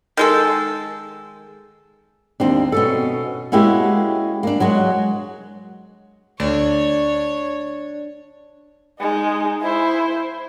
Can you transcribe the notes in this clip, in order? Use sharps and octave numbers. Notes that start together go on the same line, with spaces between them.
D#3 G#3 A4
D#2 C4 D4
B2 C#4 A4
G#3 A#3 C#4 E4 F#4 G4
A#3 D4
F#3 G#3 F#4
D2 D4 C#5
G#3 D#4
E4 C5